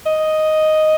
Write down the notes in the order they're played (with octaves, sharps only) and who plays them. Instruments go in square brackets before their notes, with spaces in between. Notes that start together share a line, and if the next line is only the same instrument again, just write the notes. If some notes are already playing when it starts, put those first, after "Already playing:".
[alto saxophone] D#5